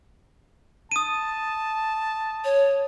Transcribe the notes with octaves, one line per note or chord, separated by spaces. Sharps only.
A5 D#6 D#7
C#5